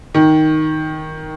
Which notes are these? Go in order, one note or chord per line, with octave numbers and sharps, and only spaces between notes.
D#3